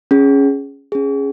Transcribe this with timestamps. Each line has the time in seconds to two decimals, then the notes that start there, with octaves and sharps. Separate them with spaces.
0.11 C#4 G#4
0.92 C#4 G#4